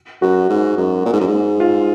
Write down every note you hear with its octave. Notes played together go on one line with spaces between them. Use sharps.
F#2 F#4
G#2
F#2
A#2
G#2
F#2
G#2
F4